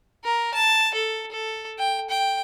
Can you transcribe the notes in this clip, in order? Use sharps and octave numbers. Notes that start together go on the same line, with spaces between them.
A#4
A5
A4
A4
G5
G5